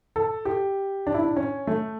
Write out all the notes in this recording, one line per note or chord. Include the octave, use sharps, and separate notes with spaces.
A4
G4
D4
E4
D4
C#4
A3